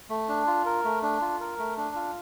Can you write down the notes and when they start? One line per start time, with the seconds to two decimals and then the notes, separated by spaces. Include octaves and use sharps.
0.10 A3
0.28 D4
0.47 F4
0.65 A#4
0.84 A3
1.02 D4
1.21 F4
1.40 A#4
1.59 A3
1.77 D4
1.95 F4